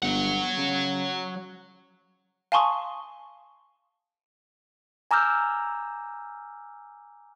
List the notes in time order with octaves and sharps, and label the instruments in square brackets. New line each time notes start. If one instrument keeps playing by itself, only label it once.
[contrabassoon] G1 [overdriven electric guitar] F#3 F#5
[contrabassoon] C#3
[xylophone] F5 G#5 A5 C6 C#6 D#6
[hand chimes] G#5 A#5 D6 E6 F6 G6